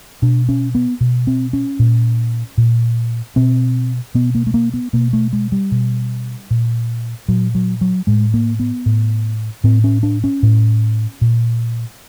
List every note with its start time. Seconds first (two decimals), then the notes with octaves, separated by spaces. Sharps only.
0.22 B2 D4
0.49 C#4
0.75 B3
1.01 B2
1.27 C4
1.53 C#4
1.79 A#2
2.58 A#2
3.36 B2 C4
4.15 B2 B3
4.35 A#3
4.47 A3
4.54 A#3
4.74 B3
4.93 B2 A#3
5.13 A3
5.33 G#3
5.52 G3
5.72 B2
6.51 A#2
7.28 A#2 F#3
7.55 F#3
7.81 F#3
8.07 A2 G#3
8.34 A#3
8.60 B3
8.86 A2
9.64 A2 C4
9.84 C#4
10.03 D4
10.24 C#4
10.43 A2
11.21 A#2